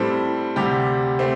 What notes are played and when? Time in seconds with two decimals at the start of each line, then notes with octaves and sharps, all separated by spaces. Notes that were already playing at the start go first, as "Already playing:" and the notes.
Already playing: A2 G3 C4 A4
0.56 D2 C3 G3 G4
1.19 A3 C4